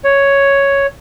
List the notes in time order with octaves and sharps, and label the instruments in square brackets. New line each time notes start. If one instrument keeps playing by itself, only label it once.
[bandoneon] C#5